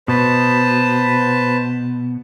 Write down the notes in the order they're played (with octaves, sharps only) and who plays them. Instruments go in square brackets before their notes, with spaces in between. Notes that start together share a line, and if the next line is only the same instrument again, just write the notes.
[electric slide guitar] B2 [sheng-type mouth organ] B4 C5 A5